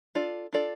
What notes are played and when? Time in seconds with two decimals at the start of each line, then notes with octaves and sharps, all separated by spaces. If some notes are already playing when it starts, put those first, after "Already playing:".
0.15 D4 F4 A4 D5
0.53 D4 F4 A4 D5